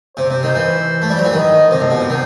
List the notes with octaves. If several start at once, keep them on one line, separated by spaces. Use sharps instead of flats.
C3 C5
C3
D#3
E3
A3
G3
F#3
E3
D#3 D#5
C3 C5
A2
B2
C3
D#3